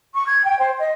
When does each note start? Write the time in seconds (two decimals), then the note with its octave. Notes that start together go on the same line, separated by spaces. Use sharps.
0.14 C#6
0.26 G#6
0.44 G5
0.58 C5
0.77 D#5